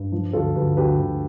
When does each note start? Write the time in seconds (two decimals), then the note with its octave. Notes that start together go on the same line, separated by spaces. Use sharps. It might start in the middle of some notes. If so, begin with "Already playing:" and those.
Already playing: G2
0.12 F3
0.33 D2 F4 A4
0.56 D2 G4 B4
0.77 D2 G4 B4
0.99 D2